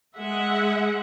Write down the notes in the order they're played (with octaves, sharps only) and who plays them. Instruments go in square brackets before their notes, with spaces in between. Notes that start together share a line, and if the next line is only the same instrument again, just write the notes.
[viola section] G#3 E5 F#5